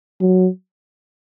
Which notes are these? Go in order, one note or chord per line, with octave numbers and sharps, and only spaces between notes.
F#3